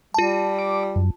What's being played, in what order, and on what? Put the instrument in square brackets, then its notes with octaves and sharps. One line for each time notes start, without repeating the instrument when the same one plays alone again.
[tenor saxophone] G3 [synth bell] F4 A5
[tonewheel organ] D6
F#2